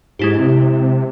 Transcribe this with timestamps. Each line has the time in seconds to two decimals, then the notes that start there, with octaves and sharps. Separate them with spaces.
0.19 G#2 G#3 E4 G4
0.38 C3